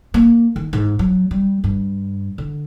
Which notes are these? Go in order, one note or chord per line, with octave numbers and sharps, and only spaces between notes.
A#3
D#3
G#2
F#3
G3
G2
D3